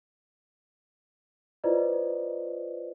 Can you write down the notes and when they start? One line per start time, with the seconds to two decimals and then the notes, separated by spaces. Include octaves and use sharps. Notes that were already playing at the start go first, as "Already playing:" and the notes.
1.64 E4 F4 B4 C5 D5 D#5